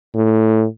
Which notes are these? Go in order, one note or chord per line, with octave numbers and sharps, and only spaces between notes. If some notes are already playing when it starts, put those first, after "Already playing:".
A2